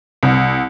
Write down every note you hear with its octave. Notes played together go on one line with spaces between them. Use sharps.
C2